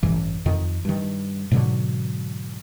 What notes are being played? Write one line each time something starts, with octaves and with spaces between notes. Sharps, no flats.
A1 G2 E3
F2 D#3
G2 D#3
G#2 B2 D3 F#3